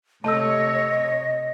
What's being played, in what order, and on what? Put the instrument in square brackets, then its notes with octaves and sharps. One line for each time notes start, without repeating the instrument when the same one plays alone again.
[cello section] C3 C#5 [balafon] A3 A4 [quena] D#5 [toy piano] A5 E6